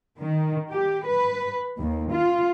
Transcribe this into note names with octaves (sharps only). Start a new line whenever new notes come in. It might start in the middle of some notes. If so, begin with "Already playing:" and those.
D#3
G4
B4
D#2
F4